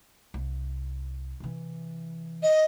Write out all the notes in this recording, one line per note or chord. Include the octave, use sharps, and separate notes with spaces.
C2
C3 E3
D#5